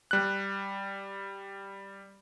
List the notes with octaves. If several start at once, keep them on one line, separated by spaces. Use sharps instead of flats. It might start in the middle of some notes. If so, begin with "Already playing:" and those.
G3 F#6